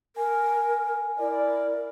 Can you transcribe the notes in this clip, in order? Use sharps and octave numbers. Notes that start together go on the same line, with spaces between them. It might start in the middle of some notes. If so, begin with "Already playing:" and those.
A#4 G#5
E4 A#4 D5